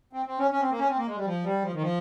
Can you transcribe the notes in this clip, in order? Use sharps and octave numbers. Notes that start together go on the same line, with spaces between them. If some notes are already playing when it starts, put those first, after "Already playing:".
C4
C4
C#4
C#4
C4
A#3
C#4
C4
A#3
G#3
G3
F3
G3
F3
D#3
F3